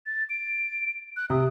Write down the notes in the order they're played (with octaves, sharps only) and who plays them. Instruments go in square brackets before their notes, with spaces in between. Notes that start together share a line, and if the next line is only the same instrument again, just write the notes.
[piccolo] A6
D7
F#6
[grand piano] C3 [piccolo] D#6